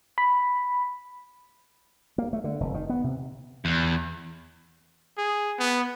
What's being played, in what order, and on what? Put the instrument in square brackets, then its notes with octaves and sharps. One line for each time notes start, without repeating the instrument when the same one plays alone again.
[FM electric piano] B5
[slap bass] A#3
A3
D3
F1
D#3
B3
C3
[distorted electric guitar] E2
[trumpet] G#4
B3